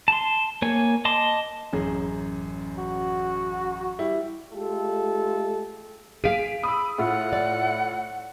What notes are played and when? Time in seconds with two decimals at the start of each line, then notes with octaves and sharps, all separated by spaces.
0.08 A5 C6
0.62 A#3 C#5 G#5
1.05 D#5 A5 C6 D6
1.73 A1 F#2 G#4
2.78 F#4
3.99 G3 E4
4.53 G#3 A3 F4 G4 A4
6.24 G#4 F5 B6 D7 D#7
6.63 B5 D#6 E6
6.98 A2 E4 F4 F#5
7.33 D5